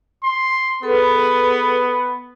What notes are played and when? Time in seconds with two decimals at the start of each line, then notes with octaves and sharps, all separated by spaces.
0.24 C6
0.82 B3 G#4 A4 B4